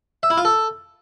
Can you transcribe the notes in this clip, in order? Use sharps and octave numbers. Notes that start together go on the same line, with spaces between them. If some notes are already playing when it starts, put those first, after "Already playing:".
E5
E4
F4
A4